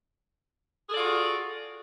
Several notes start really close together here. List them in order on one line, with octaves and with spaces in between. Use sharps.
G#4 A4 D5 F4 F#4